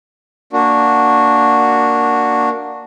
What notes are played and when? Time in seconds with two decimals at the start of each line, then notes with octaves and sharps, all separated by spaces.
0.53 A#3 D4 F#4